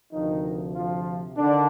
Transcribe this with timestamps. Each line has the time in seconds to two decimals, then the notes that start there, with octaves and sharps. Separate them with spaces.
0.12 D2 C3 D#3 F3 D#4
0.74 F3 F4
1.37 D3 D#3 D4